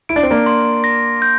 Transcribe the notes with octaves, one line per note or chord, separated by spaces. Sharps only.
E4 D7
D4
C4
A#3 D4
C6
A#6
G6